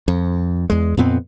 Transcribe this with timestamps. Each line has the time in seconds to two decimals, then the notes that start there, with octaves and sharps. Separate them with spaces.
0.08 F2
0.70 E2 G#3
0.97 F2 A#2 B3 C4